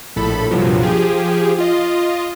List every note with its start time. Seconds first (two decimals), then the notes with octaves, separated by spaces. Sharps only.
0.16 A#1 A2 A4 B5
0.51 C2 G2 A#2 F3 F#3
0.83 F3 G4 G#4
1.58 F4 D#5